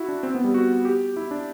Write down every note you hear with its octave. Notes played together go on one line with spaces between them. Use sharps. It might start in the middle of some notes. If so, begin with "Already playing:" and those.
Already playing: E4 F#4
D4
C4
B3
G3
F#4
G4
E4
D4